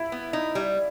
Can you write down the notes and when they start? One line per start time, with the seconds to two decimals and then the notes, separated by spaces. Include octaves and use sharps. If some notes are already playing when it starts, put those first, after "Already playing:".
Already playing: E4
0.12 B3
0.33 D#4
0.55 G3